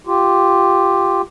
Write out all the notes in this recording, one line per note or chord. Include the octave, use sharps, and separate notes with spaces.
F4 G4